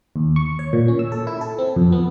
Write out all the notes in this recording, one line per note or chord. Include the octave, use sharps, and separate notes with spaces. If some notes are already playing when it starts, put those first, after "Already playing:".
D#2
C#6
C#5
A#2
C#4
E6
A4
E4
A4
C4
F2
B3